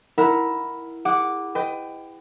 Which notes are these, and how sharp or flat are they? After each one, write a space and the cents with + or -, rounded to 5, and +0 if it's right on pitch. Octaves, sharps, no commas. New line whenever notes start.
E4 +0 A#4 +10 F#5 +0
G#4 -40 F#5 +0 D6 +0
B4 +30 D#5 +0 G5 +0